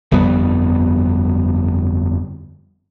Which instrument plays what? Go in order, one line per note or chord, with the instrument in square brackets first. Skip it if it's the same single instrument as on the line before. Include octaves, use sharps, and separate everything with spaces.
[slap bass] G1 F2 G3 B3